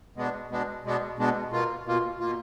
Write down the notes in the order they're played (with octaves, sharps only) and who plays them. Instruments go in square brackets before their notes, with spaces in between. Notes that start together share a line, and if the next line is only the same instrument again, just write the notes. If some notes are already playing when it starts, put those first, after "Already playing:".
[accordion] B2 G#3 B3 D4
B2 G#3 B3 D4
B2 G#3 B3 D4
B2 G#3 B3 D4
B2 A#3 F4
B2 A#3 F4
B2 A#3 F4